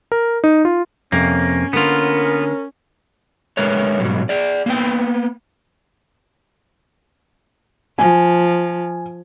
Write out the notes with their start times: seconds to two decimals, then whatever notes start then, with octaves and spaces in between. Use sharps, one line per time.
0.12 A#4
0.44 D#4
0.65 F4
1.12 F2 C3 A#3 C#4
1.73 D3 A#3 B3 F4 A#4
3.57 G#3 A3 A#4 B4 C#5
4.00 G#2 B2 F#3 G3
4.29 G#4 D5
4.66 A#3 B3 B4 G5
7.99 F3 G#5